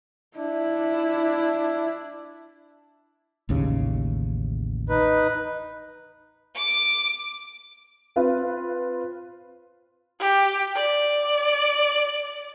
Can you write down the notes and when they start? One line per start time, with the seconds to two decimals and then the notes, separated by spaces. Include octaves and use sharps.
0.37 D4 E4
3.49 A1 D#2 C#3
4.89 D#4 B4
6.54 D6
8.16 C4 F4 B4
10.20 G4
10.75 D5